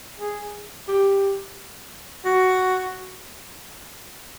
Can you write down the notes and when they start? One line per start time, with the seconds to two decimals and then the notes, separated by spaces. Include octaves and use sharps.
0.20 G#4
0.88 G4
2.25 F#4